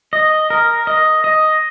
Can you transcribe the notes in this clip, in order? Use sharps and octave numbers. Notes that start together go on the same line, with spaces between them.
D#5
A#4
D#5
D#5